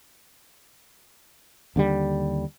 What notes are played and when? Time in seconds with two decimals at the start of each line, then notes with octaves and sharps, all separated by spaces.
1.76 D#2 D3 F3 G3